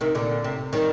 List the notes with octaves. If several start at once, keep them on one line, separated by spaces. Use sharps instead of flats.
C3 D#3
A#2 D3
C3
D#3 G3